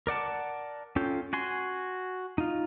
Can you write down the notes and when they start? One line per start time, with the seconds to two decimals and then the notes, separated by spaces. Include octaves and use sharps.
0.07 A#4 D5 F#5 A5
0.96 C#4 F4 A4 G5
1.33 F#4 G#5 C6
2.38 D#4 F4